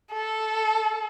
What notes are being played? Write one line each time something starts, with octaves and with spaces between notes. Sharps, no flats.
A4